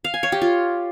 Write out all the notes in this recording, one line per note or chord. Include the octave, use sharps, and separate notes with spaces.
F5
G#5
C#5
G4
F4